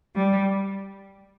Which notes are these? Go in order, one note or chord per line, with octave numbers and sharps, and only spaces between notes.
G3